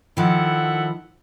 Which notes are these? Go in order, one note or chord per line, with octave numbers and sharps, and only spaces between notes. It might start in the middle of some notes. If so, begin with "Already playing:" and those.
D#3 F3 E4 A4 F#5